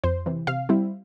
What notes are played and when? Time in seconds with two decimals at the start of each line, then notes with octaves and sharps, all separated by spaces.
0.04 F2 C5
0.26 C3 E3
0.47 C3 F5
0.69 G3 C4 E4